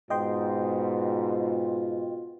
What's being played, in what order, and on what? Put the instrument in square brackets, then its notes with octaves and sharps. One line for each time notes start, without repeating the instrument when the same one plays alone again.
[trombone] G#2 [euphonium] B2 [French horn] F4 [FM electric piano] D#5 G5 C6